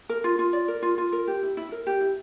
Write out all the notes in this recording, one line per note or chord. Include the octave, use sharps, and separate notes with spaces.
A#4
F4
F4
D5
A#4
F4
F4
A#4
G4
E4
E4
A#4
G4
E4